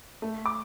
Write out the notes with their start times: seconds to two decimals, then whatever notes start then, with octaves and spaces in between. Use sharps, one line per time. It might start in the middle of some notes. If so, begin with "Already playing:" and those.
0.22 A3
0.46 D6